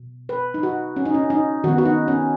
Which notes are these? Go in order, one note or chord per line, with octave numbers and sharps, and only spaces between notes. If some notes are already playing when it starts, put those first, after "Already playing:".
Already playing: B2
B4
D#4
F#4
C#4
D#4
C#4
D#4
D#3 B3 F#4
F#4
D#4
C#4